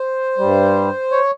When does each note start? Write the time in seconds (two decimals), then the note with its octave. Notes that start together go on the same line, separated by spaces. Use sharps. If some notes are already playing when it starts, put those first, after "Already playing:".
Already playing: C5
0.38 G2 G3
1.12 C#5